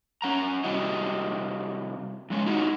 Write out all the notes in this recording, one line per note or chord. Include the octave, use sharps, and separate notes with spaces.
C#4 F#5 A#5
C3 G3 E4 F#4 D#5
F2 G#3 C#4
D#4 E4 F#4